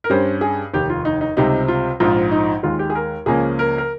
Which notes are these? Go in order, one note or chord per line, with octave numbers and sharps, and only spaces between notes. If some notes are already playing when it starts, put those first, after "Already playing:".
A#4
G2 G3 C#4 C5
G#4
F1 D#2 D#3 G4
F4
D#4
D#4
C#2 C3 G3 C4 D#4
F4
A#1 G#2 F3 F4
D#4
D#2 D#3 G#3 F4
G4
G#4
A#4
C#2 C#3 F3 A#3 C#4 G#4
A#4
A#4